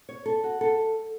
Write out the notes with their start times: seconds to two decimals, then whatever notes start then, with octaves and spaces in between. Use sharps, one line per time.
0.09 C#5
0.26 A4
0.44 F#4
0.61 A4